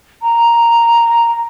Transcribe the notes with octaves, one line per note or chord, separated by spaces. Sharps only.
A#5